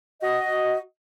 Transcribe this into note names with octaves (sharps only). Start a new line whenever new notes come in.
F#4 D#5